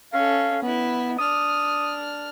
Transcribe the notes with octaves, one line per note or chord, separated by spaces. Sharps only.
C#4 A4 F5
B3 E4 B4
D4 D#6 F6